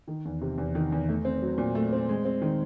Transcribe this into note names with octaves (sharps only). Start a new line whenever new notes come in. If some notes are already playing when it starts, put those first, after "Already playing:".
D#3
E2
C3
E2
D#3
E2
A3
C4
F#3
A#2
A3
C4
G#3
C4
D#3